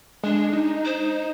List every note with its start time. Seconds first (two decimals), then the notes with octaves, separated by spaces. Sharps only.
0.23 G#3 D4
0.53 D#4
0.85 C5